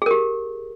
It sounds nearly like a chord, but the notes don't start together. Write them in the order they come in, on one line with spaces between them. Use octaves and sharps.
G#4 A#4 G4